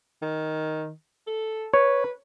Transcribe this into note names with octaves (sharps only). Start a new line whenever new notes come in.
D#3
A4
B4 C#5